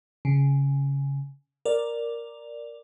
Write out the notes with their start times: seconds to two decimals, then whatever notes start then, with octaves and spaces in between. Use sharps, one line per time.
0.25 C#3
1.65 A#4 D5